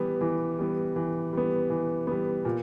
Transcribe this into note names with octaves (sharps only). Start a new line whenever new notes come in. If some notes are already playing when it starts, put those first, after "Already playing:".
Already playing: E3 G3 B3
E3
G3 B3
E3
G3 B3
E3
G3 B3
A#2